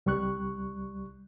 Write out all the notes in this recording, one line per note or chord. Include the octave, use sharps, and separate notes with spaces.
C2 G3 C#6 F#6